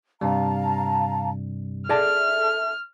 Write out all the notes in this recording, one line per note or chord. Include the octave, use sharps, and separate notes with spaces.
G2 C3 G3 F5 A5 A#5
G#4 A4 D5 E5 A5 F6